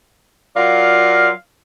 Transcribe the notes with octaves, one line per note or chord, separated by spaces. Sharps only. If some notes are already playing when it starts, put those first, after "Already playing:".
F#3 F4 A#4 D5 F5